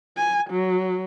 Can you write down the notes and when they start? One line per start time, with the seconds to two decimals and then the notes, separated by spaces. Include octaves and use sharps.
0.17 G#5
0.50 F#3